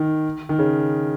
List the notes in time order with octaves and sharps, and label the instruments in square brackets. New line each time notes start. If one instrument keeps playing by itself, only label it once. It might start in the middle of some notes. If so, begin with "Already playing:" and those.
Already playing: [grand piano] D#3
D#3
C#3